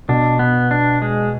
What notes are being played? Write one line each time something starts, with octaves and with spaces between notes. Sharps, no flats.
B2 D4
B3
D4
G#3